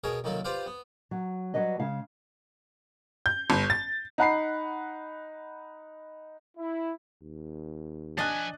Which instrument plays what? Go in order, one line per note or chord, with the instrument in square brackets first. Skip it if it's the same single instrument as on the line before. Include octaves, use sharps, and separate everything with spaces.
[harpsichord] B2 G#4 A#4 C#5 A5
C2 D#3 F#3 A#3 A4
F4 G4 B4 C5 D5 F5
B3
[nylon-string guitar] F#3
F#3 G3 B4 D#5
C#3 G#3 F5
[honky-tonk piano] G6
G1
A6
[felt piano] D#4 F#5 B5 C7
[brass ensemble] E4
[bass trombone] D#2
[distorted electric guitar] F3 G#5 [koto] D4 D#5 [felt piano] F#6 A6